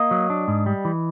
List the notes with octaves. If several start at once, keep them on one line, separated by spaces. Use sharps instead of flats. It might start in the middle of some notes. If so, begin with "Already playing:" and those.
Already playing: A#3 D#5
F#3
D4
G#2
G3
E3